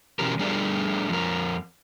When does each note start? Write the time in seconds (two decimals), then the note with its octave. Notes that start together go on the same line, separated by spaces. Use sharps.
0.19 B2 E3 C#4 F#4 G4 A#4
0.39 G3 A3 D4 G#4 A#4 D5
1.09 F2 A#4